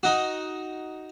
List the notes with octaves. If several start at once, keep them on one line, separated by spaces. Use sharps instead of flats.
D#4 F#4